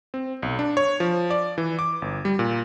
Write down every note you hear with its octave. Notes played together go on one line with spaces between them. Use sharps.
C4
B1
D4
C#5
F3
D5
E3
D6
G1
G3
A#2